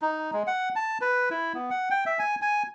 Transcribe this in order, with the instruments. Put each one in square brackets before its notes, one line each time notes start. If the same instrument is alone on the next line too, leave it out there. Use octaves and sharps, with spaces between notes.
[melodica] D#4
G#3
F#5
A5
B4
E4
B3
F#5
G5
E5
G#5
G#5